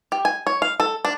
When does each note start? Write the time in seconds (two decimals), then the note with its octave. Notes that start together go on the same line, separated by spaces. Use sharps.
0.12 G4
0.25 G#5
0.47 C#5
0.62 F5
0.80 A4
1.05 D4